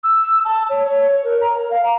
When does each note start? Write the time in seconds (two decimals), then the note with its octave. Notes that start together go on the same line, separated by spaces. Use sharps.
0.03 E6
0.45 A5
0.69 C#5
0.86 C#5
1.11 C#5
1.24 A#4
1.41 A#5
1.57 A#4
1.71 F5
1.84 A#5